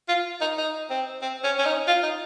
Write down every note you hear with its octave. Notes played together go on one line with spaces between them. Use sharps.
F4
D#4
D#4
C4
C4
C#4
C#4
D#4
F4
D#4